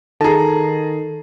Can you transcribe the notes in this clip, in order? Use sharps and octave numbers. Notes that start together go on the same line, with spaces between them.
D#3 D#4 G#4 A4 A5 A#5